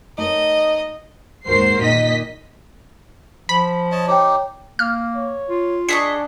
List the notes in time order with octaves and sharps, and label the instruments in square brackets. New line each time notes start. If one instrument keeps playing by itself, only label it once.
[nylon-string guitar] A3 A#4 C#5 [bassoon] D#4 [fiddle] D#5
[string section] D#2 G#2 F#4 A#4 C5 C7
A#2 D#3 D#5 B6
[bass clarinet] F3 [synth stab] B5
[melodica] C#5 D#5 A5
[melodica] D#4 G4 [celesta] C#5 G5
[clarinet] A#3 [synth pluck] F6
[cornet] C#5
[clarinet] F4
[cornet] D4 [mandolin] G#4 D#5 C#6 [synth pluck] B6